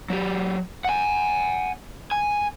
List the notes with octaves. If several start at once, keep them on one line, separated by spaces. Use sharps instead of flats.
F#3 G4
F#5 G#5
G#5